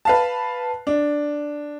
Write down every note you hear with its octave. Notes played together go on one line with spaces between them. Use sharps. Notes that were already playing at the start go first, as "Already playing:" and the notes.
B4 F5 A5
D4